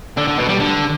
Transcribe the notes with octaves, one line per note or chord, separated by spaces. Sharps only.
D3
D3
B2
G3
D3